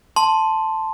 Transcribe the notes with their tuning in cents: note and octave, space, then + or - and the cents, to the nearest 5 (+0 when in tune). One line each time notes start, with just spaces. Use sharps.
A5 +0 C6 +0